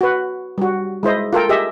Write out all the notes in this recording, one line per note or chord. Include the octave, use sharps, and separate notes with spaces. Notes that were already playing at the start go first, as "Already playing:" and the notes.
F#4 B4
G3 F#4
G#3 E4 C5 D#5
F4 A4 A#4 G5
G4 G#4 D#5 E5